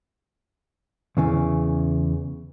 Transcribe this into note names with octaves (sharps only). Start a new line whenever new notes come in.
E2 C#3 E3